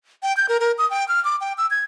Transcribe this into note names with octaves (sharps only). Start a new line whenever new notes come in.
G5
G6
A#4
A#4
D#6
G5
F6
D6
G5
E6
G#6